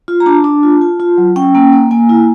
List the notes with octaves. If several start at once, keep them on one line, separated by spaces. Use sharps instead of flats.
F4
A#5
D4 A5
D4
F4
F4
F4
F#3
C#4 G5
A#3
A#3
A#3 G#5
E4